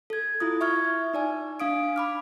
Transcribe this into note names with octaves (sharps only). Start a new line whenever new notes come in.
A4 G#6
E4 F4 D#6
E5 C#6 F6 G#6
D#4 D5 G#5
D4 F5 D#6 D7
B5 D6 F6